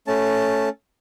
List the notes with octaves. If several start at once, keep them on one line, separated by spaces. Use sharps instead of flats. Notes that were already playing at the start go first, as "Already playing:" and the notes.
A3 C#4 A5